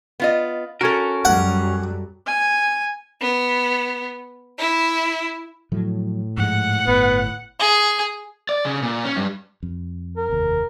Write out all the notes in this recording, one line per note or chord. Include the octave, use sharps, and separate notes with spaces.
B3 F4 D#5
C#4 F#4 A4 A#4
F#2 F#3 G3 F#5
G#5
B3
E4
A2 F3 F#3
G#2 F3 G#3 F#5
G1 B3
G#4
D5
C#3
A#2
C#4
G2
F2
A#4
F1 D#2